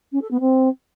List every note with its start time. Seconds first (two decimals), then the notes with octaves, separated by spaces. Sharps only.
0.12 C#4
0.22 A4
0.31 B3
0.40 C4